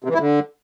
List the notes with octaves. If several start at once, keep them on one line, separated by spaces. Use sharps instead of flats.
C3
E3
E4
D3